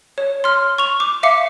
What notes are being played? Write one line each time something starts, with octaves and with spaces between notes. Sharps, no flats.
C#5
C6 F6
C#6 F7
D6
E5 F5 D6 C#7